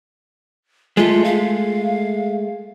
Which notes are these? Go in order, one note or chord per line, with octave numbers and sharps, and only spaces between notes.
G#3 A3 F4
F5